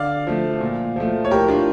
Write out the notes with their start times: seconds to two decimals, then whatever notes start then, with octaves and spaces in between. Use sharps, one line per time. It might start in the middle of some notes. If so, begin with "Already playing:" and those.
Already playing: D3 D5 F5
0.27 F3 A3
0.61 A#2
0.96 F3 A3
1.25 C#5
1.31 A2 G4 A#4
1.48 D4 F4